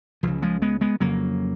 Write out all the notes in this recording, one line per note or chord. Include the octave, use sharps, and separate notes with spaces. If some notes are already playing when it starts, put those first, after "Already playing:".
C#2 C#3 F3
F3 G#3
G#3 B3
G#3 B3
F2 C#3 F#3 A#3